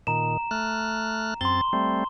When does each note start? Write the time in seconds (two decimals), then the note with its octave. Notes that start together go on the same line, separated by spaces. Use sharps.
0.07 A#2 D#3 A#5 E7
0.51 A3 F6 F#6
1.41 F#2 C4 C6 A6 G7
1.73 G3 A3 C4